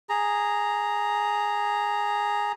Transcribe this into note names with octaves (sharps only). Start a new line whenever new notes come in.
G#4 A#5